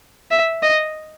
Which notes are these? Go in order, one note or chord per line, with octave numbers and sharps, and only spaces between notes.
E5
D#5